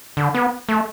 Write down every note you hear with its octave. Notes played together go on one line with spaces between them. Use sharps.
D3
B3
A3